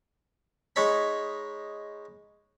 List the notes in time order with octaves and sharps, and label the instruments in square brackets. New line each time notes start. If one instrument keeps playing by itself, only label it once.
[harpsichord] G#3 D#4 C#5 B5